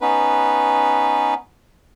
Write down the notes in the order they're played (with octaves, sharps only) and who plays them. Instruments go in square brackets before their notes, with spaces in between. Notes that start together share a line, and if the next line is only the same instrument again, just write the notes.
[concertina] B3 C#4 D#4 B4